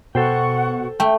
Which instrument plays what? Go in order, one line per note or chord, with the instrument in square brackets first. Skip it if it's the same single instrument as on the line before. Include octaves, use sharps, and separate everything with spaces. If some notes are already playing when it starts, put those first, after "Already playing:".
[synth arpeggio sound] B2 [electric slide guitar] A4 C5 G5 [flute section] F#5 C#6
[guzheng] A3 [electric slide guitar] G5